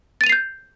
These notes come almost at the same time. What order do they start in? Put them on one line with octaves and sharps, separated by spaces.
A6 D#7 F7 C7 G6